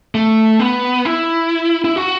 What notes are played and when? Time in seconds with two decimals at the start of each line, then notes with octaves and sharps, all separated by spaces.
0.15 A3
0.60 B3
1.05 E4
1.84 E4
1.96 F#4